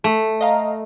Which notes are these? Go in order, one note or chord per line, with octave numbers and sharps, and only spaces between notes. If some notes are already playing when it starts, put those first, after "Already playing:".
A3
D#5 F5 A#5